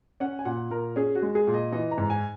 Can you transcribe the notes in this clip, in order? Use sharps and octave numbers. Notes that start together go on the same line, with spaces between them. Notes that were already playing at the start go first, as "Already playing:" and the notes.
C#4 F#5
G#5
A#2 F#5
A#2 A#4
C#4 G#4
F#4
G#3
G#4
A#2
D#5
E3 D#5
A#5
G#2
G#5